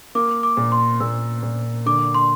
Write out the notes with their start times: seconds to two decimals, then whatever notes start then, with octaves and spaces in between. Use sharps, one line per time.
0.15 A#3 D6
0.43 D6
0.57 A#2
0.72 C6
1.00 A#2 E6
1.43 A#2
1.86 D3 D6
2.14 C6